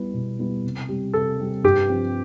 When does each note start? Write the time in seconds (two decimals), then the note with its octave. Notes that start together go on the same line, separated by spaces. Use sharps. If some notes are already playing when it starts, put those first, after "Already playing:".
Already playing: G3 B3 E4 B4
0.14 B2
0.39 G3 B3 E4 B4
0.64 C3
0.89 G3 C4 G4
1.14 C3 A4
1.39 G3 C4 G4
1.64 G2 G4
1.89 F3 C4